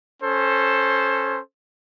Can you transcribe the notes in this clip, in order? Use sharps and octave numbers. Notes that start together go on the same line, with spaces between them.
C#4 A4 C5